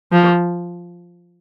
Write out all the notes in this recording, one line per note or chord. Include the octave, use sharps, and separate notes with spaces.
F3